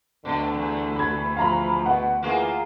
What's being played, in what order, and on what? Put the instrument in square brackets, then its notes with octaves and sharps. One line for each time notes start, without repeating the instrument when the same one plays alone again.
[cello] D2 [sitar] B2 [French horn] D3
[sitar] E2
[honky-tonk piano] B5 G#6
[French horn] F3 [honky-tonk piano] F5 A#5 B5
[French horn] B2 [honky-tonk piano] F#5
[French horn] E3 [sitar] A#3 F4 G#4